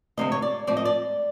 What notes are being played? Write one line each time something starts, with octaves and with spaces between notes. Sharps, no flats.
D2 C3 F3 G#3 C4 D#5
C#5
D5
A2 F3 G#3 C4 D5
D#5
D5